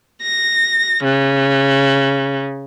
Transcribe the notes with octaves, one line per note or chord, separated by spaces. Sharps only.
A#6
C#3